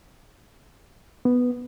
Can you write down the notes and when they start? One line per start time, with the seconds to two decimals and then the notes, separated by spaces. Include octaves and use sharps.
1.25 B3